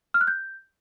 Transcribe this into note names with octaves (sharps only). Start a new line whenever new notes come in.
F6
F#6
G6